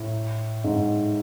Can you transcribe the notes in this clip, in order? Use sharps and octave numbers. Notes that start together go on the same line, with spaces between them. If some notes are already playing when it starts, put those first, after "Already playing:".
Already playing: A2
G#2